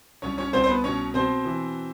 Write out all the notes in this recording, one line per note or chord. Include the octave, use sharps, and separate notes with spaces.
C2 C#4 C#5
C#4 C#5
C2 C4 C5
C5
B3 B4
B2 C#4 C#5
B2 C4 C5
E3